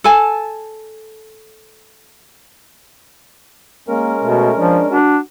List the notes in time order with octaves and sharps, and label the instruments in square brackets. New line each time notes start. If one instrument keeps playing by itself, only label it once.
[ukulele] A4 G#5 A5
[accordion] G#3 C#4 A#4 [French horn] A#3
[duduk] B2 [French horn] A3
[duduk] F3 [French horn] D4
[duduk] D4 [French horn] F#4